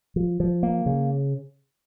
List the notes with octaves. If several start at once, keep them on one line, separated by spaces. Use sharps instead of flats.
F3
F3
A#3
C#3